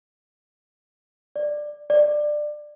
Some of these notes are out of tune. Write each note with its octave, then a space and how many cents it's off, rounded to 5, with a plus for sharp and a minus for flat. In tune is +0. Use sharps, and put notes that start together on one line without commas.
D5 +15
D5 +20